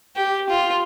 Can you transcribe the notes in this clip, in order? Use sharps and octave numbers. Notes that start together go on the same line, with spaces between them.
G4
F4